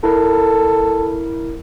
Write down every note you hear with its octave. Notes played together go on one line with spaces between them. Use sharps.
E4 A4 A#4